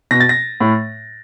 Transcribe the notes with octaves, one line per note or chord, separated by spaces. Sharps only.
B2 A#6
A6
A#6
A2